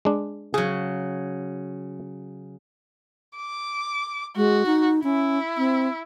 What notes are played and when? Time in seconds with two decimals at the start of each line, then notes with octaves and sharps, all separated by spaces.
0.05 G#3 D4
0.54 C#3 F#3 G#4
3.37 D6
4.36 G#3 F#4
4.66 D#4
5.04 C#4 E4
5.58 C4